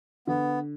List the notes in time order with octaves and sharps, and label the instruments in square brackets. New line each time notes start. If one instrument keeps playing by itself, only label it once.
[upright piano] D3 [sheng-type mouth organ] B3